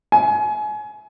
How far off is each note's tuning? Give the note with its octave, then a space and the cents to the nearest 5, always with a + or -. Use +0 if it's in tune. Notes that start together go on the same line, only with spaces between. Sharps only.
G#5 +30